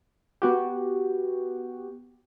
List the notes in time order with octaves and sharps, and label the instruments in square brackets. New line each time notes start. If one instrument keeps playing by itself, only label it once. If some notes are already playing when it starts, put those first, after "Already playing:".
[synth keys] B3 F#4 G4